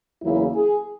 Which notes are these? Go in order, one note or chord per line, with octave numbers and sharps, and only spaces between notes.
E2 C#3 F#3 A#3 E4
G#4